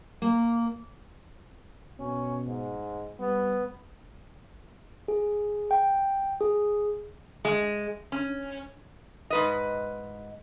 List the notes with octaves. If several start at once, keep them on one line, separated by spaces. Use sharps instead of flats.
A#3
B2 C#4
G#2
G3 B3
G#4
G5
G#4
G#3
C#4
G#2 B4 D#5